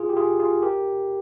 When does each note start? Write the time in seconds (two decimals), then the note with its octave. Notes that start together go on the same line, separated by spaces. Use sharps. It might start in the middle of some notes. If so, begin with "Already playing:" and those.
Already playing: F4 G#4
0.09 G4
0.17 F4 G#4
0.40 F4 G#4
0.62 G4 A#4